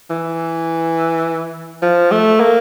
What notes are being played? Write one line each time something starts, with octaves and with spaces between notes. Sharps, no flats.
E3
F3
A3
A#3